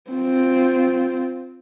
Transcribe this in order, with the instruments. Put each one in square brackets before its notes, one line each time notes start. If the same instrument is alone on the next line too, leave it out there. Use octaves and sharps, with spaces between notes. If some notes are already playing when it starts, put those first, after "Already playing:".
[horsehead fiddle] C4 F4